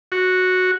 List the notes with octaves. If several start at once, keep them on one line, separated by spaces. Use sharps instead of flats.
F#4